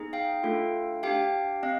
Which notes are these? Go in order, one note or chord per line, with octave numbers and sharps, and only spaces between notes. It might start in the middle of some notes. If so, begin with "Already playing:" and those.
Already playing: B3 D#4 G#4
F5 G5
A3 D4 F4 A4
D4 G4 F5 G5
C4 D#5 F5